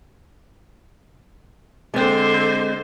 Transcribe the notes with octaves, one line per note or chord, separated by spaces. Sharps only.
D3 G#3 C4 C5